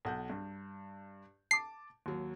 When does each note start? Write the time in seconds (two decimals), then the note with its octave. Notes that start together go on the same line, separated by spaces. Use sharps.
0.05 B1 F#5 G6
0.30 G2
1.51 A5 D6 C7
2.06 D#2 F#3